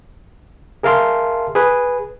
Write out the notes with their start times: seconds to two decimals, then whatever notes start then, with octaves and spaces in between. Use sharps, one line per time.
0.83 G#4 A#4 E5 F5 A5 C6
1.55 G#4 B4